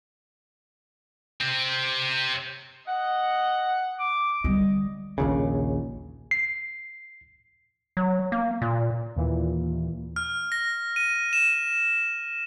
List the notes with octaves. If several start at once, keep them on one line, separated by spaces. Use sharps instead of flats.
C3 C4
D#5 F#5
D6
D3 G3 D#5
A#1 D#2 C#3
C7
F#3
A#3
A#2
D#2 A#2 E3
F6
A#6
D#7
E7